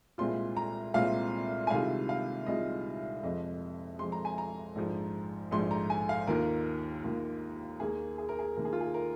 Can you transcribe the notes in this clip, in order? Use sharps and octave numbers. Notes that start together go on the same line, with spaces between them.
C2 A#2 G#3 C4 F4 C6
A#5
C2 A#2 G#3 C4 F4 F5
G#5
C2 C3 D#3 G#3 F4 F5
F5
C2 C3 D#3 G#3 F4 D#5
F1 F2 F3 G#3 D#5
F1 F2 F3 G#3 C6
A#5
G#5
A#5
A#1 G#2 F3
A#1 G#2 F3 C6
A#5
G#5
F5
D#2 D#3 A#3 F4 A#4
D#2 D#3 A#3 F4
D#2 D#3 A#3 G#4
G#4
A#4
G#4
D#2 D#3 A#3 A#4
G#4
F4
G#4
A#4